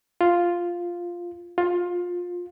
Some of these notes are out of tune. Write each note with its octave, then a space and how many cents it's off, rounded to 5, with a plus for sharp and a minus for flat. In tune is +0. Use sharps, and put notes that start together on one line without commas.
F4 +0
F4 +20